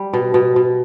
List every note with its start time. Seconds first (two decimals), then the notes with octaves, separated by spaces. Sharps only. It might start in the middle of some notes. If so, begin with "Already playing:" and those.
Already playing: G3
0.13 B2
0.34 B2
0.56 B2